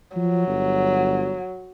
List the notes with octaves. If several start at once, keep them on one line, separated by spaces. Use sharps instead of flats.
F3 F#3
G1